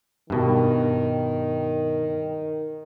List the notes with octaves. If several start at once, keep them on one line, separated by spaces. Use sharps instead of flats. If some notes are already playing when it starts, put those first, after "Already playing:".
G2 B2 D#3